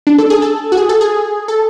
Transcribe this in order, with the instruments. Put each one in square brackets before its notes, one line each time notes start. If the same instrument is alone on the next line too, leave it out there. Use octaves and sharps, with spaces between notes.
[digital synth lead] D4
A4
G#4
A4
F#4
G#4
A4
G#4
A4